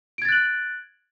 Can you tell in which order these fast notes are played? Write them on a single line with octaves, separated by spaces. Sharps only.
D7 G#6 A6 F#6 F#7